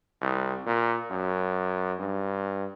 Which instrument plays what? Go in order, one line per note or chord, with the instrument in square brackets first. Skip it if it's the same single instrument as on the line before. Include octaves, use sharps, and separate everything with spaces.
[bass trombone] C2
A#2
F#2
G2